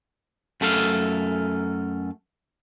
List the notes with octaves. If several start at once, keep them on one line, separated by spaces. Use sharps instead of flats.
F#2 A3 A4 F5